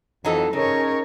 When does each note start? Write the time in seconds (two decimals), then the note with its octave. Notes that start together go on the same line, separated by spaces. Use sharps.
0.25 F2 E3 F#3 D#4 A4
0.53 C#3 C#4 D#4 G#4 A#4 C#5